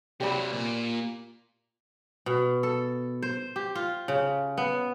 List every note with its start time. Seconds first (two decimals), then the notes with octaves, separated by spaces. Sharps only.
0.20 C3 F#3 G4 D5 B5
0.52 A#2
2.26 B2
2.63 A4
3.23 C5
3.56 G4
3.75 F4
4.08 C#3
4.58 B3